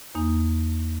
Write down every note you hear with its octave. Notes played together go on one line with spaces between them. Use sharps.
E2 A#3 D#4